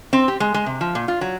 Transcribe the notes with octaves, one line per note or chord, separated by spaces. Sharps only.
C4
G4
G#3
G#3
C3
F3
A#2
F4
F#3